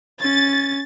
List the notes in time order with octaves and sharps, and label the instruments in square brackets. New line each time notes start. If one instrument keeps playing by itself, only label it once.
[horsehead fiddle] C#4 [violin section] A6